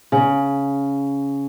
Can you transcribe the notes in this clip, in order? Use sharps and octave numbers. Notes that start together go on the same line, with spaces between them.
C#3